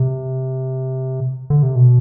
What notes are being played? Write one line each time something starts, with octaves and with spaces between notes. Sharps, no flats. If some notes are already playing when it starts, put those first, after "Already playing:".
Already playing: C3
D3
C3
B2